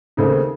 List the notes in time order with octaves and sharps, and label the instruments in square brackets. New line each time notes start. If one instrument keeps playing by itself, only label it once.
[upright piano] D#2 C#3 A3 C4 D#4